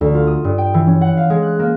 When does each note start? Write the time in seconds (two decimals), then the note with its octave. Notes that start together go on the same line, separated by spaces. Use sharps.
0.01 D2
0.14 F4
0.27 D#6
0.44 G2
0.58 G5
0.74 E3
0.87 C#4
1.01 F#5
1.17 F5
1.30 G#3
1.43 F#6
1.59 A#3